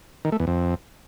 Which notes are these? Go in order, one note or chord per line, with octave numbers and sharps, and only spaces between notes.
D#3
A3
E2
F2